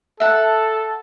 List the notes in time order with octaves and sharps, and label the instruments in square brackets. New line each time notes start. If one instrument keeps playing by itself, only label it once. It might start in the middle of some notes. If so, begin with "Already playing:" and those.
[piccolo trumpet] A4 [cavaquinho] E5 F#5 A5